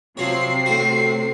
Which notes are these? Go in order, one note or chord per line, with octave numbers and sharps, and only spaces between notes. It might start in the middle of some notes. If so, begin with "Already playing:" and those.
C3 F3 F#3 C4 C#5 C7
A2 F#4